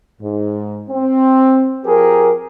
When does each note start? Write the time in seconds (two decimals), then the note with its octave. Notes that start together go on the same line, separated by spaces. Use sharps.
0.21 G#2
0.89 C4
1.85 F3 G4 G#4 A#4